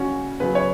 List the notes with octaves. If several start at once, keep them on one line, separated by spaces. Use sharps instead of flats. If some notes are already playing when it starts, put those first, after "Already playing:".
Already playing: C#3 G3 C#4 F#4 C#5
C#3 F#3 B3 B4
C#5